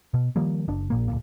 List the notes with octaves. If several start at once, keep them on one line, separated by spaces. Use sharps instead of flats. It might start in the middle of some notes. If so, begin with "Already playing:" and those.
B2
D#3 F3 G3 A#3
F#1 D4
A#1 A#2 A#3
D1 C2 A#2